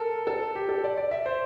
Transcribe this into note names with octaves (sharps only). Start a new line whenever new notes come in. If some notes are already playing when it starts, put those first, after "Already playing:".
Already playing: A4 A#4
A4
G4
A4
D5
D5
E5
C5